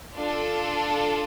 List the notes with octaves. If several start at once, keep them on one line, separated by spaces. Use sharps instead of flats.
D4 F4 A4